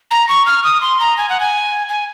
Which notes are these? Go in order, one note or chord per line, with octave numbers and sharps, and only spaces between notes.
A#5
C#6
F6
D#6
C6
A#5
G#5
F#5
G#5
G#5